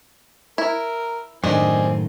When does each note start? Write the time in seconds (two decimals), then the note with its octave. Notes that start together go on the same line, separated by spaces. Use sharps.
0.58 E4 A#4
1.44 F#2 A2 D#3 C4 D4 D#5 G#5